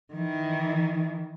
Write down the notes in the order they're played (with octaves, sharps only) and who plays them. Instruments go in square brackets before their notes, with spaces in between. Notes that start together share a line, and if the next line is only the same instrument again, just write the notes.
[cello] D#3 E3